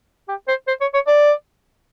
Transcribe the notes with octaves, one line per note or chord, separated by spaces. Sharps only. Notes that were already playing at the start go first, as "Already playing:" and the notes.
G4
C5
C5
C#5
C#5
D5